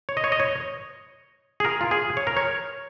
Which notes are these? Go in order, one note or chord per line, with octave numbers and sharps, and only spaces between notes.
C#5
D#5
C#5
D#5
C#5
G#4
A#4
F4
G#4
C#5
A#4
C#5